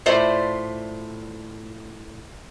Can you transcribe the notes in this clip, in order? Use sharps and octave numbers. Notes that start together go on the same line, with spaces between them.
A2 F4 C5 D5 E5